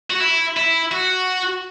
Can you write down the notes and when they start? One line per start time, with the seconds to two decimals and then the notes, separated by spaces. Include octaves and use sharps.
0.10 F#4
0.20 E4
0.57 E4
0.92 F#4